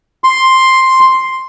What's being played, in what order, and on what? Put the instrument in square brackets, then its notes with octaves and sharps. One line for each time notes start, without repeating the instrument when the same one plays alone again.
[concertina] C6